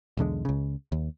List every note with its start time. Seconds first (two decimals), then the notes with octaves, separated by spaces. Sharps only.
0.17 B1 E2 D3 G#3
0.45 C#2 C#3
0.92 D#2